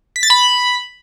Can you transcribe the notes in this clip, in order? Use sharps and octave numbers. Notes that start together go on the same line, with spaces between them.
B6
A6
B5